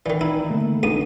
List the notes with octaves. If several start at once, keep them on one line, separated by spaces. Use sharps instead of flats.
D#3 E3 D5
D#4 E4
D3 A3 A#3
C#2 D4 D#4 A4 D#6